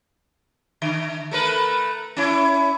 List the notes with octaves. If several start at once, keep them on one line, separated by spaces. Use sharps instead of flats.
D3
A3 A#4 B4
C#4 E4